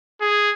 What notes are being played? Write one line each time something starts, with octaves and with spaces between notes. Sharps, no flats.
G#4